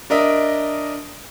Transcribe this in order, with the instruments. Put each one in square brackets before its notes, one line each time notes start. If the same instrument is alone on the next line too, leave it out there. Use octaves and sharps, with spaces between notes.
[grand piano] D4 A#4 D#5 E5